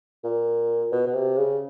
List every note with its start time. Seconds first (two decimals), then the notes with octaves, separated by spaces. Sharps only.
0.24 A#2
0.92 B2
1.07 B2
1.15 C3
1.38 C#3